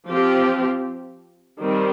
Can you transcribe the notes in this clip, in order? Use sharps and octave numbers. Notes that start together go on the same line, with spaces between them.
F3 C4 G4
D#3 G3 C4